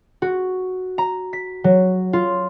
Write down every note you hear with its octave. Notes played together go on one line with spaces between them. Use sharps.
F#4
A#5
B6
F#3
F4